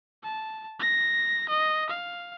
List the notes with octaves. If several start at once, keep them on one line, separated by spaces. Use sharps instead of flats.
A5
A#6
D#5
F5